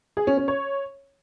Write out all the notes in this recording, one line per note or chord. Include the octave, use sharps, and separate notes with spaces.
G#4
C#4
C#4
C#5